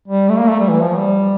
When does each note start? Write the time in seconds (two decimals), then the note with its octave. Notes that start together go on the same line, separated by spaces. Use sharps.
0.08 G3
0.29 A3
0.39 A#3
0.49 A3
0.60 G3
0.69 E3
0.83 F3
0.97 G3